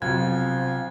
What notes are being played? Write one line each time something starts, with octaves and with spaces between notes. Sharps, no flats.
B1 C3 F3 G#6